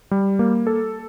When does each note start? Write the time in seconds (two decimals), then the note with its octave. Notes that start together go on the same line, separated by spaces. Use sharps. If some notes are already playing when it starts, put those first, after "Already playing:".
0.11 G3
0.39 A#3
0.67 A4